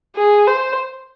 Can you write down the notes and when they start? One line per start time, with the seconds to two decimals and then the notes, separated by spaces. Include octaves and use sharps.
0.16 G#4
0.47 C5